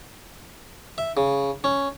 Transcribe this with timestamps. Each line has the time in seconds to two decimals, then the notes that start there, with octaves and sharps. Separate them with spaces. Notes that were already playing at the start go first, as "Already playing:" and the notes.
0.98 E5
1.17 C#3
1.64 C#4